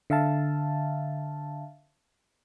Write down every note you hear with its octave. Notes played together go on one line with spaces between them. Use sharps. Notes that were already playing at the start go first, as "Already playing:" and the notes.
D3 E5 F5 A5